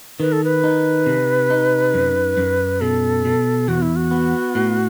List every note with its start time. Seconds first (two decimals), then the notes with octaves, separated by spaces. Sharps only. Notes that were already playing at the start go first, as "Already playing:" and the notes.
0.20 D#3 B4
0.32 A4
0.44 B4
0.64 D#4
1.06 C3
1.50 D#4
1.94 F#2
2.37 F#2
2.81 B2 A4
3.25 B2
3.68 E2 F#4
3.82 E4
3.96 F#4
4.11 B3
4.55 A2